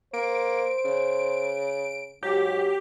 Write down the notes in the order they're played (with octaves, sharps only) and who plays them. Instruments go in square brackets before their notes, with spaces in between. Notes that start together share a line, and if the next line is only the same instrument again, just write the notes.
[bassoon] A#3 [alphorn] C5 [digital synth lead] D7
[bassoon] C#3
[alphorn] G#2 [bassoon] F#3 [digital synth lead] G4